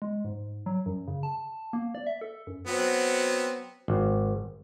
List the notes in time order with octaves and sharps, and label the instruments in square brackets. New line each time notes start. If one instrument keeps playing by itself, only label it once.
[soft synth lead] G#3
G#2
F#3
F#2
C#3
A5
A#3
D5
E5
A4
F#2
[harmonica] F#3 B3 C4
[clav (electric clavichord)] G#1